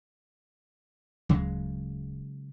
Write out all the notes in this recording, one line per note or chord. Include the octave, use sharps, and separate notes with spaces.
D1 C#3 F#3 G#3